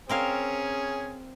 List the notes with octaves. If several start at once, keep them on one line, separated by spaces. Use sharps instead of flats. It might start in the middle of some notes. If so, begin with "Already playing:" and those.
C4 C#4 G#4 A#4 F5